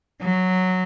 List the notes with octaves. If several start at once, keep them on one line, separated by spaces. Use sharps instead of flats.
F#3